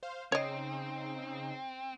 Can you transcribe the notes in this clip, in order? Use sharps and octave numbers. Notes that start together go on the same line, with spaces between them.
C5 F5
C#3 C4 D#4 C#5 D#5